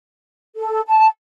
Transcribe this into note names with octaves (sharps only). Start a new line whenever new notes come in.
A4
A5